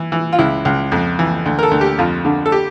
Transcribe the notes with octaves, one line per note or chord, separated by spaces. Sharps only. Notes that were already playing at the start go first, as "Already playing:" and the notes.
Already playing: E3
E3
F4
C#2 E4
C#2
F2
E3
D2
A#4
A4
D2
G4
F2 F4
D3
A4
G4